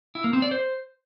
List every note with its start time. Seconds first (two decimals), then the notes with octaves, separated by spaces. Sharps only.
0.15 E4
0.24 A#3
0.33 C4
0.42 D5
0.51 C5